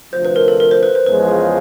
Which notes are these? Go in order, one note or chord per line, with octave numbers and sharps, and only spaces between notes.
D2 C3 F3 C5
B4
A#4
A4
A#4
C5
B4
C5
E2 C#3 F3 G#3 B4